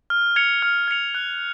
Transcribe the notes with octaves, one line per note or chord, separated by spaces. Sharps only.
F6
G#6 C#7 F7
F6
G#6 C#7 F7
F#6